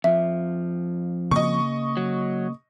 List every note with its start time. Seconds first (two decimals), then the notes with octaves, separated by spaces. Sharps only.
0.04 F2 F3 E5
1.31 C#3 A#3 D#5 C#6
1.97 F#3